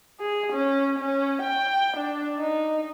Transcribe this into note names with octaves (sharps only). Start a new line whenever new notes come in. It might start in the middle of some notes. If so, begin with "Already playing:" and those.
G#4
C#4
C#4
G5
D4
D#4